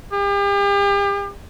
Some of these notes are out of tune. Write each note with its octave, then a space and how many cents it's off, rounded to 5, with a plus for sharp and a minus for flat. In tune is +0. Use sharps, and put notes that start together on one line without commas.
G4 +40